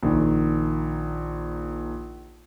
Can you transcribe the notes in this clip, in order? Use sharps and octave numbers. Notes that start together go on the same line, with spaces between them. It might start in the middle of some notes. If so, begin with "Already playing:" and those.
A#1 D#3